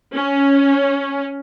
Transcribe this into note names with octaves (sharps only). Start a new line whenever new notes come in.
C#4